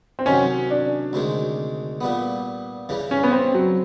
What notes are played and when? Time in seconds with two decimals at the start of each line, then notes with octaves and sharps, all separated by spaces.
0.19 C4
0.26 C3 D#3 F#3 C#4
0.70 D4
1.13 D2 C3 D#3 G#3
2.01 A#2 G3 B3
2.89 C#3 E3 G3
3.11 C#4
3.24 B3
3.32 C4
3.54 F#3